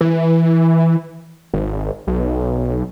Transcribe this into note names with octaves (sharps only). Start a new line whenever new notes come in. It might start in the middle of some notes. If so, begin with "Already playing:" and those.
E3
G#1
B1